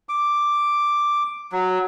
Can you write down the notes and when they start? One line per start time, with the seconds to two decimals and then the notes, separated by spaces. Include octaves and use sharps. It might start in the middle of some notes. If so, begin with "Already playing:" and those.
0.09 D6
1.52 F#3